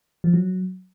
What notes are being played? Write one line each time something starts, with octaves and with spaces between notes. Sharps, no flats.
F3
F#3